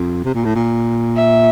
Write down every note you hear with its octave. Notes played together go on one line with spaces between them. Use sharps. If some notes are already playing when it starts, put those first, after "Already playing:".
Already playing: F2
C3
A#2
A2
A#2
E5